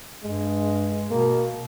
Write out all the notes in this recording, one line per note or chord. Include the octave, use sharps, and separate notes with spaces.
G2 G#3
B2 A#3